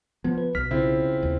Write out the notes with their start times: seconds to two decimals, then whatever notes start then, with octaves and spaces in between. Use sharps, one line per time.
0.24 F3 B3
0.38 B4
0.55 B1 F6 B6
0.71 C#3 C4 E4 F4
1.23 D#2